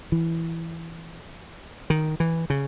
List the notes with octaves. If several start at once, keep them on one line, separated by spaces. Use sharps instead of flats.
E3
D#3
E3
C#3